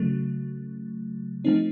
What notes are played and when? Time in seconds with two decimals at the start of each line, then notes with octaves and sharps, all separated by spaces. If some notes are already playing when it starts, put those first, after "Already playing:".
Already playing: C#3 F#3 A3
1.44 F3 A3 C4 D#4